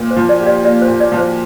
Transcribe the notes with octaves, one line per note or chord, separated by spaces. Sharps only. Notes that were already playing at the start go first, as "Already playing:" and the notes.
Already playing: A#2
C5
F3
D5
G4
D5
A#3 D5
C5
A#2
D5
F3
C5